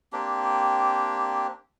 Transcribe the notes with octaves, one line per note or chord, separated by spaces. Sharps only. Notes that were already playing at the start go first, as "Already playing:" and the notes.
A#3 C4 D4 G4